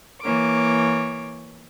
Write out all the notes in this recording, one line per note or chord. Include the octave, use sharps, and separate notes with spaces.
E3 A#3 C#5 D6